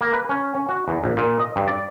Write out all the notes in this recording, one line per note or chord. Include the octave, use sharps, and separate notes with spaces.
A#3
B4
C#4
C#4
F#4
E2
A#1
A#2
D#5
G2
D5